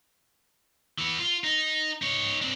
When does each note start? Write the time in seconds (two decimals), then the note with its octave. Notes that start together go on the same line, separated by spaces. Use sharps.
0.99 E3 B3
1.20 F4
1.44 D#4
2.02 D#4 C#5
2.42 C4 D4